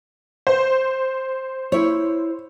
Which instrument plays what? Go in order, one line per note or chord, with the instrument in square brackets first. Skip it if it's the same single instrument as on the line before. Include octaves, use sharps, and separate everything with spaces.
[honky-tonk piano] C5
[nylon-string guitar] E4 C#5